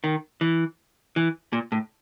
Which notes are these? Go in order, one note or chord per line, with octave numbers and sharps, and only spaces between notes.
D#3
E3
E3
A#2
A2